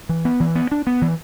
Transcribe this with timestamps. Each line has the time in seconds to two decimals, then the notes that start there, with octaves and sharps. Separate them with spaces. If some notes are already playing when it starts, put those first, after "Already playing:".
0.09 E3
0.25 B3
0.40 E3
0.55 B3
0.72 D4
0.87 B3
1.02 E3